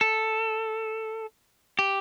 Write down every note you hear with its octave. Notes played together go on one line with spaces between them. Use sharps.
A4
G4